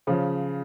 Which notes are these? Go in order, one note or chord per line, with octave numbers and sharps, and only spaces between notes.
C#3 F3